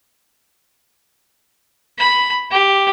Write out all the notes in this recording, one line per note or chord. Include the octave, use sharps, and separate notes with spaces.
B5
G4